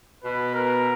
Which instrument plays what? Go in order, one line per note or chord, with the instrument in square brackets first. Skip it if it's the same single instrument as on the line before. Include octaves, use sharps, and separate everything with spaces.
[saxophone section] B2 [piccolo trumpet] B4
[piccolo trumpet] A#4